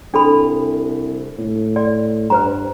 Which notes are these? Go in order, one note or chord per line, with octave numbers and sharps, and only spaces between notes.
C2 D4 A4 B5
A2
D5
G2 B4 C5 A#5